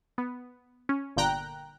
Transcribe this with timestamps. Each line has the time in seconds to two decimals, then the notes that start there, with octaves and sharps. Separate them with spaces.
0.18 B3
0.89 C#4
1.17 G1 A#2 D3 G5 A#5 F#6